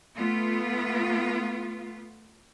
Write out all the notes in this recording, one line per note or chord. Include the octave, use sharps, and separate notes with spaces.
A3 B3 F4